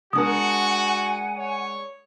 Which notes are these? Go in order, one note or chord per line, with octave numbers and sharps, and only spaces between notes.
G#3 D4 F#4 A#4 F#5 G#5 D#6
C#5